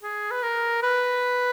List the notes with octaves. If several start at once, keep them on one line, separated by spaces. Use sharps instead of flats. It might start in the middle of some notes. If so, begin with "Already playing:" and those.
G#4
B4
A#4
B4